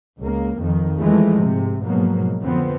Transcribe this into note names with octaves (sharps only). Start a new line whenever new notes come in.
C#2 A#3
F2 D#3
F2 E3 F3 G#3 A3
G#2 C3
G#2 B2 F3 F#3 A#3
F2 D3 F3 B3 C4